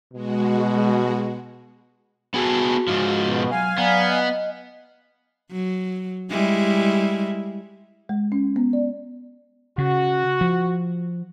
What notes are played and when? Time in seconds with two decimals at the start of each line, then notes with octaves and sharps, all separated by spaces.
0.13 B2 G#3 F#4
2.34 B3 F#4 G#4 A4
2.88 G#2 F3
3.26 B2
3.51 F#3 F5 G#5
3.78 F#3 B3 D5 A#5
4.08 D#5
5.51 F#3
6.30 G3 G#3 E4
8.09 G#3
8.32 C#4
8.56 B3
8.73 D5
9.78 C#3 F#4
10.41 F3